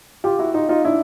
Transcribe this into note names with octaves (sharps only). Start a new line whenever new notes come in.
F4 G4
E4 F#4
D#4 F4
D#4 F4
D4 E4